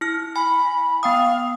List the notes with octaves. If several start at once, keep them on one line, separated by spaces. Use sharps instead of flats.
E4 F6
G#5 B5
B3 F5 G5 D#6